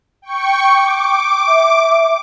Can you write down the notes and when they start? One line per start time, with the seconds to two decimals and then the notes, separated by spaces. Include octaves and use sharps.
0.22 G5 C#6 C#7
0.67 D6
1.48 E5